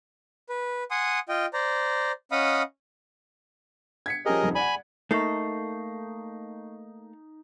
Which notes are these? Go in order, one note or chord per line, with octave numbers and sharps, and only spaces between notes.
B4
F#5 G#5 C6 D#6
F4 D#5 G5
C5 D5 A#5
C#4 D#5 F5 F#5 B5 D#6
G#6 B6 C#7
F3 C#4 G4 G#4 A#4 D#5
D#1 F2 D#4
D5 F#5 G#5 B5
A3 A#3 D#4 A4 C#6 G6 C7